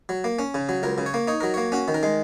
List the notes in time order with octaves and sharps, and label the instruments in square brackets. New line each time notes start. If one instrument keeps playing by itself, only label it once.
[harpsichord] F#3
A#3
C#4
C#3
F#3
C#2 A#4
C#3
C#5
A#3
D#4 C#5
F#3 A#4
A#3 C#5
C#4 F#4
D#3
A#4
G#3